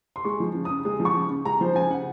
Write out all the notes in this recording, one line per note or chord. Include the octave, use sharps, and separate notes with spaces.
C6
G#3 C#6
F3
C#3
D#6
C#3
G#3 D#6
F3
C#6
C#3
C#3
G#3 A#5
F3 C5
C#3 G#5
C#3 F#5